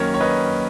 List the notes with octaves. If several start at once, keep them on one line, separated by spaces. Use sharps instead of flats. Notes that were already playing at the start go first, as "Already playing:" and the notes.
Already playing: F#2 D#3 A#3 C#4 A#4 C#5
C#5
B4 D#5